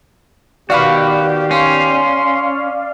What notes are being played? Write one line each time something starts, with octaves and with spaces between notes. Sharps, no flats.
D#3 B3 F#4 G4 B4 D5 F5
C#4 C6